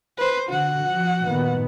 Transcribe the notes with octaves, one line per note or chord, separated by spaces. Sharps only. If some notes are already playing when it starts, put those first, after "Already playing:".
B4 C5
D3 F#4 F#5
F3
A#2 D#3 B3